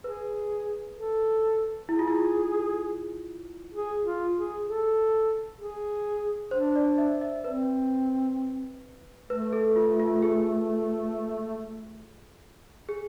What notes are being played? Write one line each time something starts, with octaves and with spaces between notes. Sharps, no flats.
G#4 B4
A4
E4 G#4
F4
E4
G#4
F4
G#4
A4
G#4
D4 C5
D5
E5
E5
C4 B4
A3 B4
A4
F4
F4
G#4
G#4